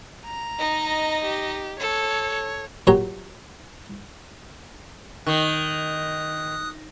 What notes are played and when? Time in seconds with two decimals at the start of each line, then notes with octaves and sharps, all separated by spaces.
0.25 A#5
0.59 D#4 D#5
1.25 G4
1.80 A4 C#5
2.87 A#2 F#3 G4 C#5 A#5
5.27 D#3 D#6 F#6